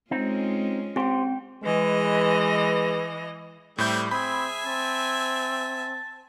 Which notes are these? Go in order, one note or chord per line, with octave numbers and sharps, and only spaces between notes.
G#3 C4 C#4 D#4 F4
C4 G4 C5 G5
E3 G#3 B4 D#5
A2 G3 A3 C4 E4 G6
C4 G#4 E5 G#5 B5
C4 A5